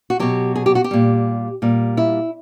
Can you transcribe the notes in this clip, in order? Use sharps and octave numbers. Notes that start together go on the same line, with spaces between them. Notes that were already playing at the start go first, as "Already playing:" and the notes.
F#4
B2 F#3 G4
G#4
G4
F#4
G4
A#2 G3
A#2 G3
E4